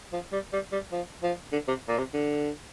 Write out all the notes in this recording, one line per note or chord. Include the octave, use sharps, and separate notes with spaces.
F3
G3
G3
G3
F3
F3
D3
C3
A#2
C3
D3